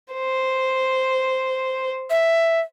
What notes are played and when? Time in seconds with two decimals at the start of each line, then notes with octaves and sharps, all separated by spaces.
0.13 C5
2.10 E5